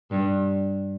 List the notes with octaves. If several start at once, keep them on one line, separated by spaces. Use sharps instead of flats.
G2